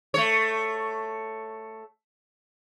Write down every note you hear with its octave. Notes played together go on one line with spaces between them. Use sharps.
A3 C#5